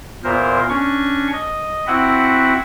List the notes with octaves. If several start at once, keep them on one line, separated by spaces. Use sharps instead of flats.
E2 A#2 A#4 C5
C#4 D4 C#6
D#5
C4 E4 F#4 E5 F#5